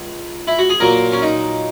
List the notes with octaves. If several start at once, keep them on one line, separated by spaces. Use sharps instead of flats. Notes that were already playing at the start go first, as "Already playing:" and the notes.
Already playing: C#2
E4
F#4
G#4
A#2 F#3 A#3 A#4
C#4
D#4